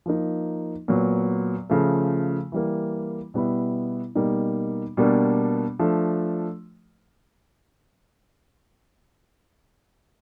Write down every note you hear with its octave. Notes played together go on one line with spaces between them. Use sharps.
F3 A#3 D#4
A#2 F#3 B3
C#3 F3 A3
E3 G3 A#3
B2 G3 B3 E4
B2 G3 A#3 D#4
B2 G3 A#3 D4
F3 A3 D4